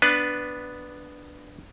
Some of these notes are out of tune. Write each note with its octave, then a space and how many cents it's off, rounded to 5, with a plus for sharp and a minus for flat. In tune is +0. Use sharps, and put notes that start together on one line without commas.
B3 +0 D4 +0 B4 +0